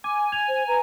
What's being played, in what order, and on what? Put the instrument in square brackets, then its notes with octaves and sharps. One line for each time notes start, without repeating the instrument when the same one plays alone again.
[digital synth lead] G#5 [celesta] D6
[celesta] G#6 F7
[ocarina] C5
[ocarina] B4 [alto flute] A#5